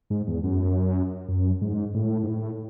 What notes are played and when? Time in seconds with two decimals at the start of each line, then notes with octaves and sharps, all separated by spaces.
0.10 G#2
0.27 E2
0.44 F#2
1.28 F#2
1.61 G#2
1.94 A2
2.24 G#2
2.28 A2